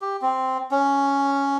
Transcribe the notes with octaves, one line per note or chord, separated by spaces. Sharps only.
G4
C4
C#4